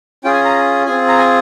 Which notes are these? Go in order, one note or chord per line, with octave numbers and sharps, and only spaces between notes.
C#4 F4 G#4 G5
G#5
A#5
C4 F4 G#4 G#5
A#5
G#5